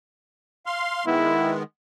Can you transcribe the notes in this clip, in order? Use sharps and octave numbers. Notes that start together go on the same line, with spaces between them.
F5 C6
D#3 G#3 B3 E4